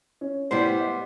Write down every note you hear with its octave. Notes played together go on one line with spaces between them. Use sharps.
C#4
A2 G3 B3 C5
D#5